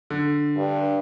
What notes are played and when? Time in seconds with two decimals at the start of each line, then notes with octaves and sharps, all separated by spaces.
0.10 D3
0.57 G2